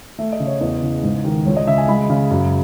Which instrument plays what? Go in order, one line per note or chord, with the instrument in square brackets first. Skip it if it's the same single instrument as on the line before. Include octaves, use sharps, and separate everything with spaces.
[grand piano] A3 E5
D#5
C#3
C#5
E2 D#5
C#3
G#2
D#3
C#2 C#5
D#5
C#3 E5
G#5
G#3 B5
C#3
F#2